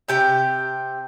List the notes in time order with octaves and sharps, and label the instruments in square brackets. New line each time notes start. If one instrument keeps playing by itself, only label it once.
[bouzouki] C3 G4 G5